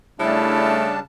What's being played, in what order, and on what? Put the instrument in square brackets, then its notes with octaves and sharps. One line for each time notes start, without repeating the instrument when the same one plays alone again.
[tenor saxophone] C#3 [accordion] G3 D4 A5 [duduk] A3 [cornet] E4